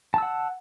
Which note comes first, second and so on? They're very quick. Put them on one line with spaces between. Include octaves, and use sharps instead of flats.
A5 E6 F#5